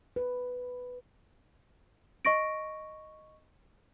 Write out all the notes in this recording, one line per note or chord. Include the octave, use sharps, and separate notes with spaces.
B4
D#5 C#6 A#6 D7